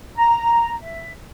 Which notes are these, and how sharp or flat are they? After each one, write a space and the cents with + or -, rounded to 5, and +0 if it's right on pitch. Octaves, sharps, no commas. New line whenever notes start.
A#5 +0
E5 +10